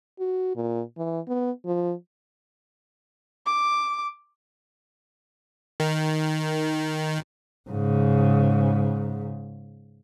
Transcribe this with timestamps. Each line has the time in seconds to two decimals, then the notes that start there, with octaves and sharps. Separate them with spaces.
0.19 F#4
0.56 A#2
0.97 E3
1.28 B3
1.66 F3
3.46 D6
5.80 D#3
7.70 G#2 C#3